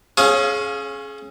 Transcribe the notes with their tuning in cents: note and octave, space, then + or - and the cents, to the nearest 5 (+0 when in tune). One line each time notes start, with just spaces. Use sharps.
C#4 -20 G#4 +25 F5 +20